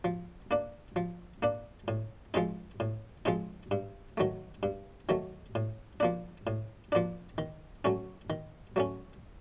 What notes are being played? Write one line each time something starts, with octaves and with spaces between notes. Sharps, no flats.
F3
A#3 D4
F3
A#3 D4
A2
F3 G#3 C4 D#4
A2
F3 G#3 C4 D#4
G2
D#3 F#3 A3
G2
D#3 F#3 A3
A2
F3 A#3 D4
A2
F3 A#3 D4
D#3
F#3 A3 C#4
D#3
F#3 A3 C#4